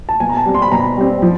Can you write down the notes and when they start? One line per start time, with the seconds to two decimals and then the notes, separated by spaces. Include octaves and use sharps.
0.09 A5
0.20 B2 G#5
0.29 A#5
0.37 A5
0.45 G3 C4
0.55 C6
0.62 B5
0.72 B2 A#5
0.80 B5
0.97 G3 C4
1.22 F3